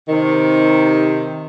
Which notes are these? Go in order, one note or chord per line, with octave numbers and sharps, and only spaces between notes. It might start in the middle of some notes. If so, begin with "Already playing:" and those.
C3 D#3